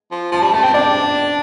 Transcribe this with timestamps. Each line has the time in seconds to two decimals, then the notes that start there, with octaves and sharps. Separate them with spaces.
0.11 F3
0.32 F3 A5
0.42 G3 A5
0.53 A3 A5
0.63 C4 G5
0.74 D4 D5